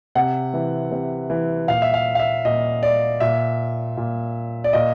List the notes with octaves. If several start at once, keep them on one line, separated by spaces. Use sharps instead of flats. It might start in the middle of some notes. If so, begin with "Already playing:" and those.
C3 F#5
E3
C3
E3
A#2 F5
E5
F5
F5
E5
A#2 D#5
D5
A#2 E5
A#2
D5
A#2 D#5